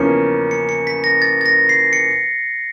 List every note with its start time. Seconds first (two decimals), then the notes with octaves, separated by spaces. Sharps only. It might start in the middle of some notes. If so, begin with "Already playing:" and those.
Already playing: E2 C#3 F3 A#3 C#4 C#7
0.51 C#7
0.69 C#7
0.87 B6
1.04 A#6
1.22 A6
1.41 A6
1.46 A#6
1.69 C7
1.93 C#7